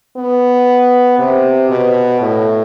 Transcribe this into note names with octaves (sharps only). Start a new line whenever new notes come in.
B3
C3
B2
A2